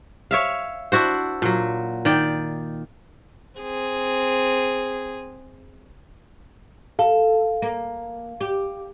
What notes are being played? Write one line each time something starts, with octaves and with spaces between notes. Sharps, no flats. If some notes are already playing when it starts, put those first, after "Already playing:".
C#5 E5 F5
D4 E4 F#4 C5
A#2 F#3
D#3 D5 G5
C4 G#4
A4 F5
A#3
G4